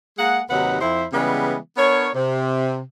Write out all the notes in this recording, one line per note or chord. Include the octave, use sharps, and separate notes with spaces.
G#3 A#3 G#4 F#5
D#2 C3 F#3 D#4 B4 F#5
F2 E4 C5
C#3 E3 G3 G#3 B3
B3 D4 A#4 C#5
C3